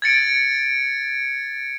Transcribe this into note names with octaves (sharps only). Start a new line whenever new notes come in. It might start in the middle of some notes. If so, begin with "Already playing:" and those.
G#6 A6 C#7 D7